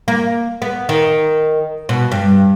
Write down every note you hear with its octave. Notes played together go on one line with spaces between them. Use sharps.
A#3
B3
D#3
B2
G2